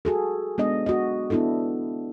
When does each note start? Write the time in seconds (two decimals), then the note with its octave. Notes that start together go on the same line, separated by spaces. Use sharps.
0.05 F#4 G#4 A4
0.58 G#3 B3 D4 D#5
0.86 F#4 D#5
1.30 B3 D4 E4 F#4 A4